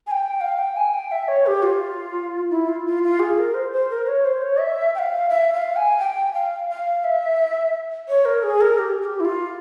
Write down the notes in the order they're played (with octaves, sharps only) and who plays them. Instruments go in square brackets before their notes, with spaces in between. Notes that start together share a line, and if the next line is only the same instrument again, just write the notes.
[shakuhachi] G#5
G5
F5
G5
G#5
G5
E5
C#5
G4
F4
E4
F4
F4
F4
G#4
A#4
C5
C5
A#4
C#5
C5
C#5
E5
G5
F5
E5
F5
G#5
G5
F5
F5
E5
C#5
A#4
G#4
A#4
G4
G#4
G4
E4
F4